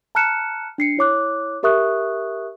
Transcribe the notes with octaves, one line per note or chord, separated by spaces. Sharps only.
A5 A#5 F6 F#6 C#7 E7
D4 C7 C#7
E4 C#5 D6 F#6
G4 A#4 E5 C#6 D#6 F#6